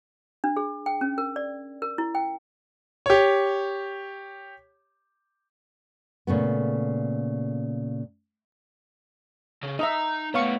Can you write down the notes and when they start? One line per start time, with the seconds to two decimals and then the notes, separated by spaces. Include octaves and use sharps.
0.44 D4
0.57 G#4
0.86 G5
1.01 C#4
1.18 A#4
1.36 D5
1.82 A#4
1.98 E4
2.15 G5
3.06 G4 C#5
6.27 A#2 C#3 A3 B3
9.63 C#3
9.79 D#4 D#5 E5 A#5
10.34 A2 B3 C#5 F5 C#6